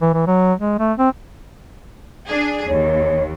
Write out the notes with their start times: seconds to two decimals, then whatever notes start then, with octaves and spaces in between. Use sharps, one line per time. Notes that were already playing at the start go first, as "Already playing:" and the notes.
0.01 E3
0.14 E3
0.27 F#3
0.59 G#3
0.79 A3
0.97 C4
2.28 D4 G#4
2.69 D#2 C#5